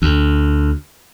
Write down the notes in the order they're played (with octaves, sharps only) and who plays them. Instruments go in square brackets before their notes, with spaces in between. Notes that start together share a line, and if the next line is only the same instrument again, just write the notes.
[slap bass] D2